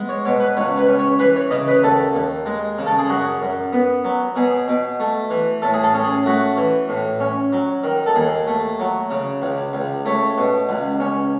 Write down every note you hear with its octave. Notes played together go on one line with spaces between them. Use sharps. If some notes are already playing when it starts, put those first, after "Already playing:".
Already playing: G#3 B3
C#5
B2 C#5
B4
C#2 C#5
B4
C#4
C#5
E3 B4
C#5
C#3 D#5
B4
D#2 A4
D#2
G#3
C#3
A4
G#4
F#2 F#4
F#2
B3
F#3
B2 G#4
B2
A3
E3
A2 A4
G#4
A4
C#4
G#4
A3 F#4
E3
A2
C#4
F#3
D#3
A4
D#2 G#4
A3
F#3
C#3
C#2
C#2
A3 C#5
B2
C#2
C#4